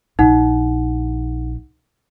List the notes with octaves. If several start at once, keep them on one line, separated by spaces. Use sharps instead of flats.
A#1 D#4 F#5